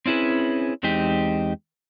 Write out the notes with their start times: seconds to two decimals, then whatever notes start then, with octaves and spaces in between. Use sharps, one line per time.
0.06 C4 C#4 E4 G#4 B4
0.83 E2 G#3 C4 D#4 G4